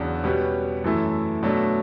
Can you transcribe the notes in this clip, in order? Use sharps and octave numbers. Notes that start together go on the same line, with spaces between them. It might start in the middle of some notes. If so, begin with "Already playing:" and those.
Already playing: E2 C#3 F#3 B3 D4
B2 G3 C#4 G4 B4
F#2 E3 A3 E4
B2 F#3 A3 D4